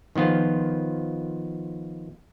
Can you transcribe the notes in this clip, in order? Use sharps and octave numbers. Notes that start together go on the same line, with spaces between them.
D#3 F3 B3 F4